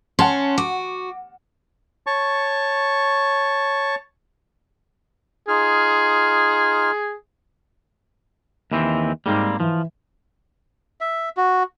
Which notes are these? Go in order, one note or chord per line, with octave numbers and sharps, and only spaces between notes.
C#4 F#5 A5 C6
F#4 D6
C#5 A5 C#6
D#4 F4 G#4 F6
D#2 E3 C4
G#2 G3 A#3 C4
E3 F3
E5
F#4